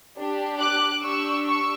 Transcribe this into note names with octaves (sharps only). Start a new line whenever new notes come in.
D4 G4
D6 F#6
D4 G4 C#6 E6
C#6 E6